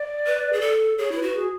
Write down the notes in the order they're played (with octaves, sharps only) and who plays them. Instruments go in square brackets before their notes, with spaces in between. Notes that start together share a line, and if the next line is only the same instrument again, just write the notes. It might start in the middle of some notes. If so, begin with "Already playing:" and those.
Already playing: [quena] D5
[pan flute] B4
G#4
A4
[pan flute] G#4 [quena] C#5
[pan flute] E4 [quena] B4
[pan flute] F#4
[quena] G#4